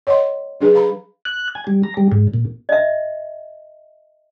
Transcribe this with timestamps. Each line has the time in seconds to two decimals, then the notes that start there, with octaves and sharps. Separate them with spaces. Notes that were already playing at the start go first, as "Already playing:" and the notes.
0.07 C#5 D#5 F#5 C6
0.61 F#3 D4 G#4 B4
0.74 B4 F5 A#5 B5
1.25 F#6
1.55 G#5
1.67 G3
1.83 A#5
1.97 G3
2.12 G#2
2.34 A#2
2.69 D#5 E5